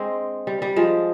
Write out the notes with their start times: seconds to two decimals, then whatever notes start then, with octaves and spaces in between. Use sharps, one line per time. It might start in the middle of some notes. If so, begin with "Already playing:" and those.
Already playing: G#3 C4 D4
0.47 G3
0.62 G3
0.76 F3 G#3